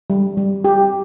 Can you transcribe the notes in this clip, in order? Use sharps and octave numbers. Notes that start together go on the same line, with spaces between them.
G3
G3
G4